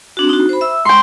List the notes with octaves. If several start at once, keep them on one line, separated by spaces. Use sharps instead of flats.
C4 D4 F#4
D#4 F#4
C5 B5
E5 E6
G#3 G5 C6 C#6